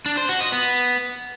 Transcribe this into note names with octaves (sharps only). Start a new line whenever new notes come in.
D4
C5
F#4
D#5
B3